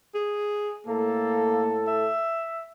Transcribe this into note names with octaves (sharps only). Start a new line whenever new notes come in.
G#4
A2 A#3 A4
E5